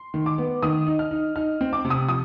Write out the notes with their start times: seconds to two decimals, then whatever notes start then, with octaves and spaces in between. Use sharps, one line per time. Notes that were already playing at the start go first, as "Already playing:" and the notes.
Already playing: C6
0.14 D#3
0.26 D6
0.38 B3
0.63 D#3 D#6
0.87 D#4
0.99 F6
1.11 D#4
1.36 D#4 F6
1.61 C4
1.73 D6
1.85 C3
1.90 D#6
2.09 F3 D#6